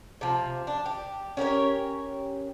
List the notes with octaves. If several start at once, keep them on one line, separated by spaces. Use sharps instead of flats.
C3 F3
D4
G4
C#4 G4 A#4 C#5